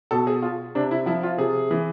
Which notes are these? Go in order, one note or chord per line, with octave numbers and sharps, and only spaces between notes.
B2 A4
G#4
F4
C3 D4
E4
F3 E4
F4
C3 G#4
E3